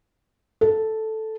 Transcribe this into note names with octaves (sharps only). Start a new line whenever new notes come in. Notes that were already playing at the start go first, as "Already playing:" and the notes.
A4